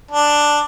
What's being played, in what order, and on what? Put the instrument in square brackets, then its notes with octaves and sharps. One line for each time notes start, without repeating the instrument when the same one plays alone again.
[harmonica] D4